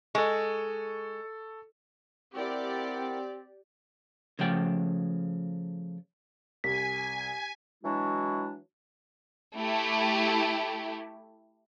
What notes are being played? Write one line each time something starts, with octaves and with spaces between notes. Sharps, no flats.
G#3 A4 C#6
C4 E4 G4 A#4 D5 F#5
C#3 F3 A3 G5
C2 G#5 B6
E3 F#3 G#3 D4 E4 F#4
A3 E4 G4